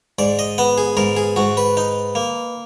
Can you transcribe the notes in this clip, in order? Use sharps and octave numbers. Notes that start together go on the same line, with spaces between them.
G#2 D5
D#5
B3 F#5
G#4
G#2 A#4
G#4
G#2 F#4
B4
D#4
A#3